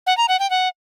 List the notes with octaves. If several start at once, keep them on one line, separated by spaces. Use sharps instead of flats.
F#5
A#5
F#5
G5
F#5